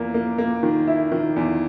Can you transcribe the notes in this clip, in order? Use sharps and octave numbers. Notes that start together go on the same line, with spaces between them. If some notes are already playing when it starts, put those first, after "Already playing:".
Already playing: E2 A#3
A#3
A#3
D#3
E4
D#3
E2